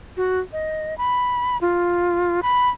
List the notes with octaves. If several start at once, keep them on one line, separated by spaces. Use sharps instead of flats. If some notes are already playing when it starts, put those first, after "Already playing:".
F#4
D#5
B5
F4
B5